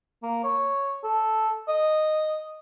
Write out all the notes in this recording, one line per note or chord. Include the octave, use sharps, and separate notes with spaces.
A#3
C#5
A4
D#5